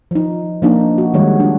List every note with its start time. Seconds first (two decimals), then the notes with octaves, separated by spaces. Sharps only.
0.11 F3 D#4
0.62 F3 A#3 D4 D#4
0.98 F#4
1.14 D#3 G3 G#3 C#5 F#5
1.40 D4 F4